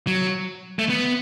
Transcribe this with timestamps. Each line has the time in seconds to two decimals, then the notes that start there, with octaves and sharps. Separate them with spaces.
0.07 F#3
0.79 A3
0.89 B3